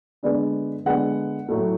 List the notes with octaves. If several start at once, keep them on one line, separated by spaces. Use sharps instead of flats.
D3 G#3 B3 D4 D5
D3 G#3 B3 D4 F#5
A2 F#3 A3